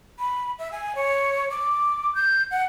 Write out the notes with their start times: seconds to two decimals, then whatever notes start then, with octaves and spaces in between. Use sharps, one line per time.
0.18 B5
0.59 E5
0.72 G#5
0.95 C#5
1.50 D6
2.15 G6
2.51 F#5